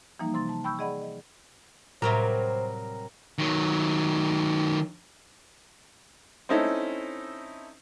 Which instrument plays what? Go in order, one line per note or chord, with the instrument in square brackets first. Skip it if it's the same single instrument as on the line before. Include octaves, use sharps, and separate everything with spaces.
[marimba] E3 F3 G3 A#3 D#4
C3 C6 A6
A5
G5 B5 C#6 E6 G6
G#4 D5 D#5 F#5 B5
D#5
[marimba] A2 [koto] C3 F#3 G3 [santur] A#4 [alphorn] C5
[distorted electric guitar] D#3 F#3
[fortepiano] C4 C#4 D#4 E4 A4